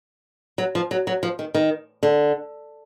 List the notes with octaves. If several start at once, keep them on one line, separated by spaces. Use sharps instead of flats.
F#3
F3
F#3
F#3
F3
D#3
D#3
D3